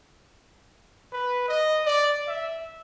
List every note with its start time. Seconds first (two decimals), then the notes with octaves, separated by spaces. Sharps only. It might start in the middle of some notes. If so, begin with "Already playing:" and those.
1.12 B4
1.48 D#5
1.86 D5
2.27 E5